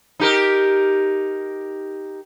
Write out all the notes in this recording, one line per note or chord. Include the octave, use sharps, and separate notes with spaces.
D#4 G4 A#4